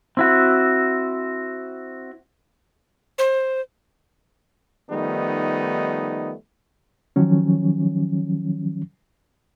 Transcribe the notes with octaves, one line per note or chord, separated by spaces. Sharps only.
C4 E4 F#4
C5
D#3 F3 G3 A3 B3 D#4
D#3 F3 F#3 C#4